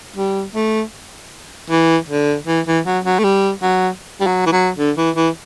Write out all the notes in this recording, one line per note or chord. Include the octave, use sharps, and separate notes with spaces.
G3
A3
E3
D3
E3
E3
F#3
F#3
A3
G3
F#3
G3
F#3
E3
F#3
D3
E3
E3